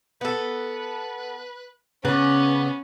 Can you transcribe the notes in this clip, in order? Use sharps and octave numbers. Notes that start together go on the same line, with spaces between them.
B3 A4 B4
C#3 B3 C#4 B4 D5